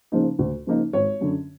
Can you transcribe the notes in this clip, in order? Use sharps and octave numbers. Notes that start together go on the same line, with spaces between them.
C#3 F3 A#3 D#4
D2
C#3 F3 A#3 D#4
G#1 C#5
F#2 D3